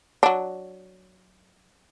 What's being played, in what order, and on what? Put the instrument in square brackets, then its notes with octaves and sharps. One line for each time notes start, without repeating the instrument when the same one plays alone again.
[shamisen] F#3 D4